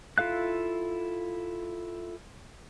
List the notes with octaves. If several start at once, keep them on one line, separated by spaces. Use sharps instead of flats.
E4 F4 A4 F5 F#6